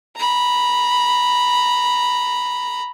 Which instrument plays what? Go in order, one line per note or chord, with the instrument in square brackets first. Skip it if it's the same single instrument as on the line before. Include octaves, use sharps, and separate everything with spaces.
[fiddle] A#5 B5